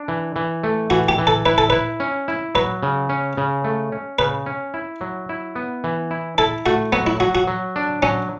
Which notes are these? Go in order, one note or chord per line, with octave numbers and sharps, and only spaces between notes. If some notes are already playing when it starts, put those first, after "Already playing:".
Already playing: D4
E3
E3
A3
E3 F#4
G4
E3
A4
E4 B4
A4
E4 B4
C#4
E4
F#3 B4
C#3
C#4
C#3
A3
C#4
C#3 B4
C#4
E4
F#3
E4
B3
E3
E4
E4 A4
A3 F#4
F#3 B3
E4
F#3 F#4
F#4
F#3
D4
F#3 C#4